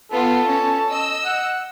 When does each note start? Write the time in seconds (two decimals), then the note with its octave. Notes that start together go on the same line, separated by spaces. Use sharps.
0.12 B3 F4 A4
0.47 C#4
0.90 D#5 E6
1.25 F#5